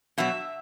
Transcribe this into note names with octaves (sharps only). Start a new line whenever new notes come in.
B2 F#3 E5